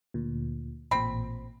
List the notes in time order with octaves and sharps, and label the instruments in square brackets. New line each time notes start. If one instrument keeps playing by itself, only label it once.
[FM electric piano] D2 A#2
[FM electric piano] A1 A#2 [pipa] C4 B5